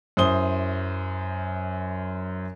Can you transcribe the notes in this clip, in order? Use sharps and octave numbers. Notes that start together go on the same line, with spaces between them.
F#2 E4 C5 D#6 G7